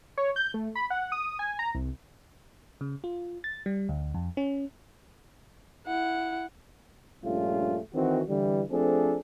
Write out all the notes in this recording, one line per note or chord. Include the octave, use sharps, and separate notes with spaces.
C#5
G6
A3
B5
F#5
D#6
G#5
A#5
C2
C#3
F4
A6
G3
D2
F2
C#4
E4 F#5
A#1 G2 G3 A3 C#4 F4
D#3 E3 C4 F#4
D3 E3 G3
F3 A3 C4 D4 G#4 A4